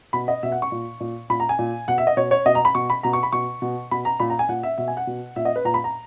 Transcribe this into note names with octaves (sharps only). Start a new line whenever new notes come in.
B2 B5
D#5
B2 E5
F#5
C#6
A#2
A#2
A#2 B5
A#5
G#5
A#2
B2 F#5
E5
D#5
B2 C#5
C#5
B2 D#5
A#5
B5
B2 C#6
B5
B2 A#5
C#6
B5
B2 C#6
B2
B2 B5
A#5
A#2 B5
A#5
G#5
A#2 F#5
E5
B2 E5
G#5
F#5
B2
A#2 E5
D#5
B4
A#2 A#5
B5
A#5